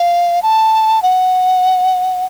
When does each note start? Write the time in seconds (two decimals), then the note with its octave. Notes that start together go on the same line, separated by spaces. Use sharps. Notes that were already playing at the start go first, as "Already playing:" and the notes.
Already playing: F5
0.43 A5
1.02 F#5